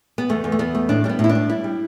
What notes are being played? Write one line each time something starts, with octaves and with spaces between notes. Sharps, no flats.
B3
E2 A3
E2
A3
E2 B3
A3
A2 D4
G3 D4
B3
A2
E4
D4
A2
G3 E4
G3